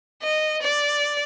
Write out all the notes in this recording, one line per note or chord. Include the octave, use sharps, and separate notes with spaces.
D#5
D5